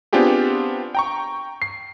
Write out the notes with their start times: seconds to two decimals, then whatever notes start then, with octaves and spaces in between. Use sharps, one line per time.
0.13 B3 C4 D4 F4 G4 G#4
0.95 G5 A#5 C#6
1.62 C7